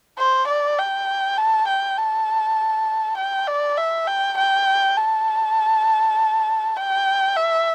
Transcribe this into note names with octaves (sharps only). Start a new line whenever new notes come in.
C5
D5
G5
A5
G5
A5
G5
D5
E5
G5
G5
A5
G5
E5